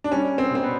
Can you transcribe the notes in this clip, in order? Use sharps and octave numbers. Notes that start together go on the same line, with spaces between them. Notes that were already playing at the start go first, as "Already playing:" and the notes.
D4
G3 C#4
C4
B2
C4
B3